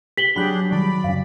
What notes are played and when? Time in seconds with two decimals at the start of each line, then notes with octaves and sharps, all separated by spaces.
0.17 G4 B6 F#7 G7
0.36 F#3 D4 G4 G#4 B5 F#6
0.71 D#3 G3 D5 B5
1.04 F#2 C#3 F5